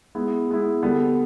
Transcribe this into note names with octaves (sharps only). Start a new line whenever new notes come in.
G#3 B3 E4
G#3 B3 E4
D3 G3 B3